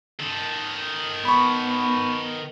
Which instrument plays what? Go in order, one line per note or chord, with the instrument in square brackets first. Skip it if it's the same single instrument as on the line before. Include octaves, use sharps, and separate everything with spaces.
[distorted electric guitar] D#3 A4
[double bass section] B3 [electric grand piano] B5 C#6